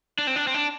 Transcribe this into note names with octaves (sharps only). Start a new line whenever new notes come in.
D4
C4
D4
C4
D4